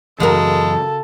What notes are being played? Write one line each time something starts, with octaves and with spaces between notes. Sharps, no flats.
F#2 C#3 E3 G#3 F#4 A4 A#4